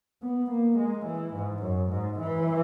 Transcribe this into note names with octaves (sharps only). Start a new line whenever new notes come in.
B3
A#3
G#3
E3
G#2
F#2
G#2
E3